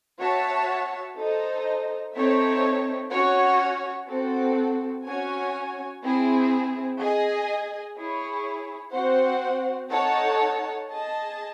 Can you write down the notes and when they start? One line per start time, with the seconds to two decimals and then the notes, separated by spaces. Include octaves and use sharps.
0.19 F#4 C#5 E5 A5
1.16 D#4 A4 C5 D#5
2.13 C4 D#4 A4 C#5 E5
3.10 C#4 F#4 C#5
4.08 C4 F#4 A4
5.05 C#4 F#4 C#5 G#5
6.02 C4 E4 G#4
6.98 G#4 D#5 G#5
7.97 E4 G#4 C#5
8.93 C4 F#4 C5 F#5
9.90 D#4 A4 C#5 F#5 A5
10.87 G#4 D#5 A5